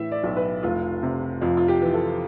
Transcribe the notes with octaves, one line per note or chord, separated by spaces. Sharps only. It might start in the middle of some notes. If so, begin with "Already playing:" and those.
Already playing: A2 E3 E5
D5
B1
B4
F1 F4
C3
F2 F4
F4
G4
E3
A4